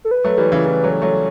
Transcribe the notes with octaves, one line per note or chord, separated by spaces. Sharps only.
A4
B4
F#3 A3
E3 G3
C#3 E3
E3 G3
F#3 A3
F#3 A3